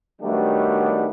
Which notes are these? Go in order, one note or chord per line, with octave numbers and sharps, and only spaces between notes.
D#3 F#3 G3 A3 B3 D4